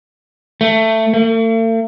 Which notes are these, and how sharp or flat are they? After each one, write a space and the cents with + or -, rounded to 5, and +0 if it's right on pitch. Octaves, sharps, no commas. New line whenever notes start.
A3 +15
A3 +45